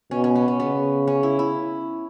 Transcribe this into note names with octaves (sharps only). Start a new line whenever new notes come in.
B2 C#4
C#4
B3
C#4
C#3 B3
C#4
E4
E4